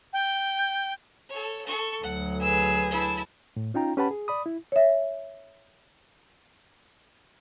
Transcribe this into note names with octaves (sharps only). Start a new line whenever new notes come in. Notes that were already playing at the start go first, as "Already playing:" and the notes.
G5
A4 C#5
A4 C#6
D2 F#3 F#5
G#4 B4 E6
E4 A5
A2
C#4 D#4 F4 G5 A#5
C#4 G4 B4 F#5 A5 B5
G#4
D5 B5 D#6
E4
C#5 E5